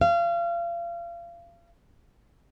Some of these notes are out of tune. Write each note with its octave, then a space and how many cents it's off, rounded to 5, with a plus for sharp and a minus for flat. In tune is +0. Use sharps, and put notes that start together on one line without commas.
F5 -30